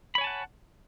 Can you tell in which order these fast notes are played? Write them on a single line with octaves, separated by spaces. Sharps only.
B5 C#5 G#5 A5 F#5